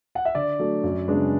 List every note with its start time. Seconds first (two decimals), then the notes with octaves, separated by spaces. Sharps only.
0.15 F#5
0.25 E5
0.35 D3 D5
0.59 F#3 A3 D4
0.84 F#2
1.08 C#3 G#3 B3 D4